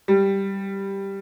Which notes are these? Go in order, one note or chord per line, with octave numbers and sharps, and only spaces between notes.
G3